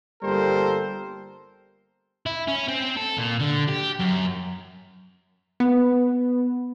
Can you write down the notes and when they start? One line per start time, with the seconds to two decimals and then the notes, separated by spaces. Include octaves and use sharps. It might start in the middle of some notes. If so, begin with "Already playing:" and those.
0.22 G1 G3 A#3 A4 A#4 C5
2.26 E4
2.48 C#4
2.68 C4
2.97 A4
3.18 A#2
3.40 D3
3.68 G4
3.99 F#2
5.60 B3